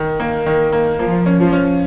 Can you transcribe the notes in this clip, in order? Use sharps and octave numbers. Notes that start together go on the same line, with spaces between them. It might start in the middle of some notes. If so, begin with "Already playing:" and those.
Already playing: D#3
A#3
D#3
A#3
F3 A#3
C#4
F3
C#4